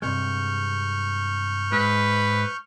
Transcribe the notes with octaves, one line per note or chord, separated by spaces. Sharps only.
G2 C3 G#3 C#6 F6 G6
G#2 B4